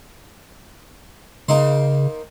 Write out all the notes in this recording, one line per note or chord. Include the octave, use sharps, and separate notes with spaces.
C#3 A#3 D#4 C5